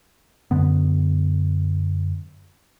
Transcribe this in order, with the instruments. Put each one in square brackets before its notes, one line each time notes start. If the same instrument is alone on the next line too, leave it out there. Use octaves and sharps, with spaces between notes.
[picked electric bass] F#2 D3 B3